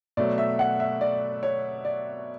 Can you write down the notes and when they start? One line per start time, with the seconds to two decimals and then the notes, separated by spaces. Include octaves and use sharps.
0.17 B2 F#3 A3 D5
0.38 E5
0.59 F#5
0.80 E5
1.01 D5
1.43 C#5
1.85 D5